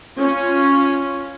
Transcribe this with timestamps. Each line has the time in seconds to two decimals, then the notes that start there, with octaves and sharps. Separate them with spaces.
0.18 C#4 F4